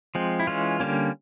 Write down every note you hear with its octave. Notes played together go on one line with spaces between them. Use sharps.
F3 G#3 C4
E4
E3 G#3 C#4 F4
D3 G3 A#3 C#4